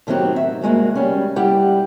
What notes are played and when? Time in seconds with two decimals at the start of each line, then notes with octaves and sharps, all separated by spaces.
0.07 A2 D#3 F#3 C4 F#4 G4
0.36 E5
0.61 D2 G2 G#3 A#3 F#4
0.96 G3 C#4
1.36 G3 E4 G4 F#5